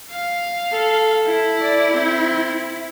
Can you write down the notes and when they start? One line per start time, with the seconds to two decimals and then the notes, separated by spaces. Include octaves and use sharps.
0.11 F5
0.72 A4
1.27 E4
1.61 D5
1.92 C4